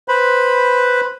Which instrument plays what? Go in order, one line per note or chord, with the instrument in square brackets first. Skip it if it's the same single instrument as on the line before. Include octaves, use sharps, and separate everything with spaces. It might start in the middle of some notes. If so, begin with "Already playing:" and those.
[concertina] B4 C5 B5